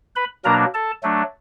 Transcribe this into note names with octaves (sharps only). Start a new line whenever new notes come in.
B4 B5
B2 F#3 A#3 D4 A#4 A#5
A4 A5
F#3 A3 D4